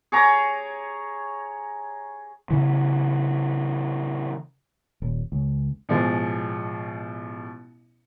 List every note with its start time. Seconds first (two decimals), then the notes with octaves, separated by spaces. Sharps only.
0.12 G#4 C#5 A#5 D6
2.50 C#3 E3
5.02 D#1
5.32 C#2
5.89 A1 B2 F3 G#3